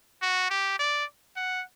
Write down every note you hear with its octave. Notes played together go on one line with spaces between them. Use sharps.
F#4
G4
D5
F#5